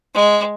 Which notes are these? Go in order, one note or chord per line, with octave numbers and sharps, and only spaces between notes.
G#3